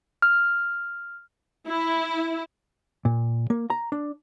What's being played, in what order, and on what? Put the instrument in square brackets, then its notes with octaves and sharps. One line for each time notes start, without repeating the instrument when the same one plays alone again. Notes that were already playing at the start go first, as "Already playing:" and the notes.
[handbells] F6
[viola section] E4
[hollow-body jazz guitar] A#2
A#3
A#5
D4